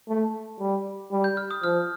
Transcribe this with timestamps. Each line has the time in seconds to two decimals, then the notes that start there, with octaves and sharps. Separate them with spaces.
0.08 A3
0.60 G3
1.11 G3
1.24 G6
1.37 F6
1.51 D#6
1.63 F3 F6